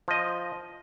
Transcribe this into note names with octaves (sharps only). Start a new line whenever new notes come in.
F3 D#5